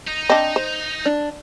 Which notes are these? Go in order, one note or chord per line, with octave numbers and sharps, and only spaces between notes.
D#4
C4 D4 D#5
C5
D4